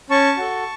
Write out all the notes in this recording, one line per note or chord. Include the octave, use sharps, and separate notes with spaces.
C#4 A5 C#6
F#4 A4